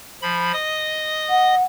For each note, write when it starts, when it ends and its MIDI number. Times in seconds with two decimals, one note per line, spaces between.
0.22 0.52 53
0.22 0.52 83
0.53 1.55 75
0.53 1.55 87
1.29 1.63 78